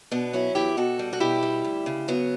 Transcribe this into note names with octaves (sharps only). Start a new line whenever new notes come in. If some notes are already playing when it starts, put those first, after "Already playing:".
B2 B3 D4
F#3 C#4 E4
E2 E4 G4
B2 F#4 A4
G3
F#4
B2 E4 G4
G3
D2
C#3
F#3 B3